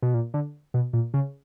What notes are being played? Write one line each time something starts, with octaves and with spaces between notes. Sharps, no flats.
B2
A#2
D3
B2
A#2
C#3